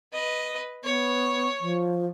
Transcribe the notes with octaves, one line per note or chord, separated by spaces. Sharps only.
B4 D#5
B3 C#5
F3